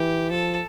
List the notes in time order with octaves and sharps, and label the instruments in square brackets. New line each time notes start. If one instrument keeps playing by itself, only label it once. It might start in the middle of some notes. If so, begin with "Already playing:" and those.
Already playing: [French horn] E3 [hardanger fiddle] G4
[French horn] F3 [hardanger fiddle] A4